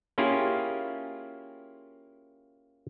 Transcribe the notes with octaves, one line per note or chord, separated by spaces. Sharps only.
A#3 C#4 E4 F4 G4 G#4